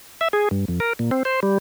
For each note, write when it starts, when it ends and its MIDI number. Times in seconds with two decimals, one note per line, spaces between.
0.21 0.28 76
0.33 0.49 68
0.51 0.65 43
0.68 0.80 41
0.80 0.93 70
0.99 1.11 46
1.11 1.23 60
1.25 1.40 72
1.43 1.58 55